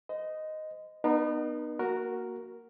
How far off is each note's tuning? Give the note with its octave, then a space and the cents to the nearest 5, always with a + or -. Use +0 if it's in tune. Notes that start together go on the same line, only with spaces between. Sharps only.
C5 -35 D#5 +0
B3 +0 D#4 -35 B4 -45
A#3 +0 F#4 +0 A#4 +0